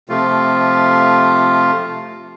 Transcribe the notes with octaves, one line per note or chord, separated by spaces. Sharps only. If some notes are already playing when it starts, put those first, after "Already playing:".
C3 F3 A3 F4